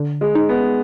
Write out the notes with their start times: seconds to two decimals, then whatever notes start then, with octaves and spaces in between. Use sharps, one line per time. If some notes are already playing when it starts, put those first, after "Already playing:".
Already playing: D3
0.21 G#3
0.35 D#4
0.49 B3